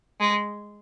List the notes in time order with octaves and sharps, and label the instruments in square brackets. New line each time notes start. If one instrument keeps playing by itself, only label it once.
[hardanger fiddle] G#3